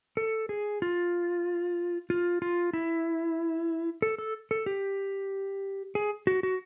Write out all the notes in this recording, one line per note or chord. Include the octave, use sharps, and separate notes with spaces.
A4
G#4
F4
F4
F4
E4
A4
A4
A4
G4
G#4
F#4
F#4